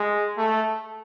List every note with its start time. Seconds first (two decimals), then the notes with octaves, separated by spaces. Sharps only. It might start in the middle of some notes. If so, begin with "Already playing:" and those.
Already playing: G#3
0.37 A3